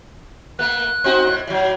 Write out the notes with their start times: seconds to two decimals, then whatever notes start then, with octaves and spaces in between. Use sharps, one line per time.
0.59 A3 A#3 F#6
1.04 C4 D#4 F#4
1.27 A2
1.47 A2 F#3